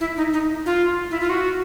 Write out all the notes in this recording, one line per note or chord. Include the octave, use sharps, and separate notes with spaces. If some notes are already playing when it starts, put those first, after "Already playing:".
E4
D#4
D#4
F4
E4
F4
F#4